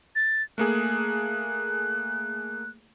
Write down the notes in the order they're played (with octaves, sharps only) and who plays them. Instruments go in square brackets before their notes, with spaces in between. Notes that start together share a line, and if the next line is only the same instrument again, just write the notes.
[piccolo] A6
[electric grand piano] A3 A#3 G#4 [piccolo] F#6